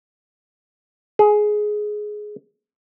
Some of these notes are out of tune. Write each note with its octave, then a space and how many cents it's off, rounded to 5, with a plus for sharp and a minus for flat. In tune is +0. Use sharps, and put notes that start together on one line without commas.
G#4 +15